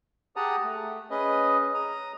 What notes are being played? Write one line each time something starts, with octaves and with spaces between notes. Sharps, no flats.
G4 G#4 F#5 A5 A#5 D#6
A3
C#4 G#4 B4 D#5
A#5 D#6